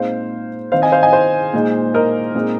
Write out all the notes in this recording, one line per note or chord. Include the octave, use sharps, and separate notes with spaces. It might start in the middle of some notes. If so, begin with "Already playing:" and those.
Already playing: A#2 G#3 C4 D#4 C5 F5
D#3 C4 D#4 C5 F5
D#5 G#5
C5 F5
D#5 G#5
C5
A#2 G#3 D#4
A#4 D#5
A#2 G#3 C4 D#4